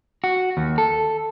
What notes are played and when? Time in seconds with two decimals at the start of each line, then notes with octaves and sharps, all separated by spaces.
0.24 F#4
0.57 D#2
0.78 A4